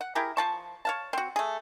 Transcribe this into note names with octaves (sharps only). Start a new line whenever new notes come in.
F#5
E4 G4 G#4 A#4
F3 A5 C#6
C#5 F5 A5
C4 F#4
A3 G#4